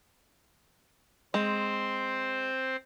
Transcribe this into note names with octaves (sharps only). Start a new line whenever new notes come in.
G#3 C4 C5